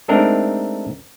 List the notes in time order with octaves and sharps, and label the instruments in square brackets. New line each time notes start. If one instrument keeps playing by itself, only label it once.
[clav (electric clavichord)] G#3 A3 C4 D4 D#4 A#4